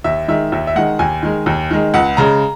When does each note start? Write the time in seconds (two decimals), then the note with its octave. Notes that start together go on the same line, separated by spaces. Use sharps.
0.04 D#2 E5
0.28 D#3 G#3 E5
0.52 D#2 E5
0.67 E5
0.76 D#3 G#3 F#5
0.99 D#2 G#5
1.23 D#3 G#3
1.46 D#2
1.71 D#3 G#3
1.94 C#2 F#5
2.17 C#3 G#3 A#5